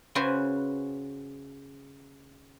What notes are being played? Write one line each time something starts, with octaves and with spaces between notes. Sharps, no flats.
C#3 F#4 B4 C5 F#5 G#5